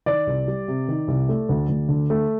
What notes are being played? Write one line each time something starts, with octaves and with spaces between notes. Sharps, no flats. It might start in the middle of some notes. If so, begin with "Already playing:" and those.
D#3 D5
C2
G3
C3
D#3
C2
A3
D2
D2
D3
A3